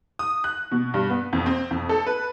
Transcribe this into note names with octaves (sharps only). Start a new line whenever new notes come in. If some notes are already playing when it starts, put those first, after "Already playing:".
D#6
F#6
B2
G2
B3
F2
C4
F2
A4
B4